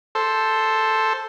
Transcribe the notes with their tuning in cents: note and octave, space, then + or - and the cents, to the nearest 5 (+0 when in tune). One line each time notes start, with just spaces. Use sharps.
A4 +0 C5 +0